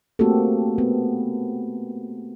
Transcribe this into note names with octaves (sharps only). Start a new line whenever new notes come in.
A3 A#3 C4 F#4 G4 A4
B3